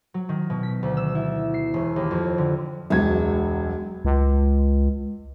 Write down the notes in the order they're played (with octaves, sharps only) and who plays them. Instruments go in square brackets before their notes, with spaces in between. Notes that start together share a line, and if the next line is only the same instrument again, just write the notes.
[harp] F#3
D#3
B2
B6
D2
E6
E4
C7
E1
D#2
F2
D3
[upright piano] E1 C#2 G#6 [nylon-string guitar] F#3
[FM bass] C#2